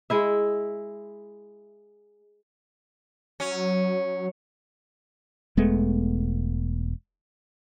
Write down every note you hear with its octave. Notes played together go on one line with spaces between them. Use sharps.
G#3 E4 E5
F#3 C#4
E1 G#3 A3 B3